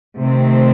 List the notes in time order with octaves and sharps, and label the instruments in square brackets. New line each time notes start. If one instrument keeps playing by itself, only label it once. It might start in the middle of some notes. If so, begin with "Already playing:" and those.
[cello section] C3 D#3 A3 C4